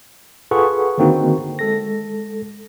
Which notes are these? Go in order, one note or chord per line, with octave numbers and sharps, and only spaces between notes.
F4 G#4 A4 B4 F#5 C#6
D3 D#3 A#3 C4 D#4 F#4
G#3 A4 A#6